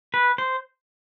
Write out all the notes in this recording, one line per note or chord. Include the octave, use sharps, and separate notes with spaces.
B4
C5